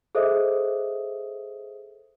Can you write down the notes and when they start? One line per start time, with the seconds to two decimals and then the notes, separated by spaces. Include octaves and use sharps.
0.15 G#4 A4 C5 D#5 E5 D#6